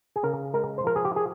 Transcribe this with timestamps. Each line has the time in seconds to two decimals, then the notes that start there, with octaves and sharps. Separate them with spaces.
0.16 G#4
0.23 C#3 A#4
0.54 G#3 A#4
0.78 C5
0.84 F3 A#4
0.96 G#4
1.05 G4
1.16 G#4